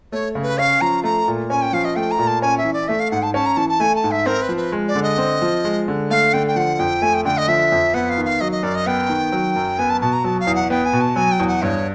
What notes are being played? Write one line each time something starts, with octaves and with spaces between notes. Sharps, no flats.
A3 C#5
C#3
B4
C#4 F5
F3 A#5
A3 A#5
A#2
C#4 G#5
G5
F3 F5
D#5
A3 G5
A#5
A#2
A5
C#4 G#5
E5
E3
D5
A3 E5
F5
G#2 F#5
A5
C#4 A5
A#5
E3 A5
A5
A3 G#5
A5
G#2
E5
C4 A#4
B4
F3
B4
G#3
D5
D3
D#5
C4
F3
G#3
D3
A3 F5
D3 G5
G5
F3 F#5
F2 G5
A3 G#5
G5
D3 G5
D#5
F3 E5
F2
B3 F#5
F5
D#3
F5
F#3 D#5
D#5
F#2 D5
D#5
B3 G5
D#3
F#3
F#2
B3 G#5
A5
B2 A5
A#5
F#3 A5
F5
E2
F#5
B3 G5
G#5
B2
A5
F#3 G#5
G5
E2
F#5
G2 C#5